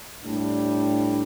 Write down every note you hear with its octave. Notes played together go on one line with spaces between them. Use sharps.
A2 G3 D4